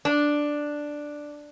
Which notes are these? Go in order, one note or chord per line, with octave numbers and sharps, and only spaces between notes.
D4